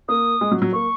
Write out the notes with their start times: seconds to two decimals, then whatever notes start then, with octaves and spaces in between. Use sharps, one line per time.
0.09 A#3 D#6
0.41 G#3
0.52 F#3
0.62 F#3
0.73 A#3 C#6